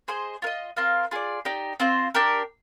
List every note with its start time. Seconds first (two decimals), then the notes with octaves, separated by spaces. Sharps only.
0.08 G#4 C5 D#5
0.42 F4 A#4
0.47 D#5
0.77 C4 F4 A#4 F5
1.11 F4 G#4 D5
1.45 D#4 G4 D5
1.80 C4 F4 C5
2.15 D4 G4 A#4